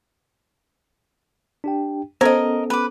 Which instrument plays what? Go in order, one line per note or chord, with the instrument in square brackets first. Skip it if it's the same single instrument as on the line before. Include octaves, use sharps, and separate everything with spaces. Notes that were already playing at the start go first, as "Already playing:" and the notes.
[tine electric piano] D4 G4 G5
[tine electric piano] B3 C#4 A4 [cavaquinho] A#4 D#5 [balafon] C5
[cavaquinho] B4 D6